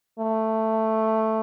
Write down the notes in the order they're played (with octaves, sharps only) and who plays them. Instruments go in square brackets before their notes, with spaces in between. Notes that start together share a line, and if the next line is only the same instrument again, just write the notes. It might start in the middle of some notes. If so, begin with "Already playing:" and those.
[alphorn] A3